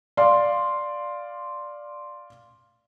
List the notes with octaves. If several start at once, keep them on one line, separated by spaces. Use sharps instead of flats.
D5 F5 C6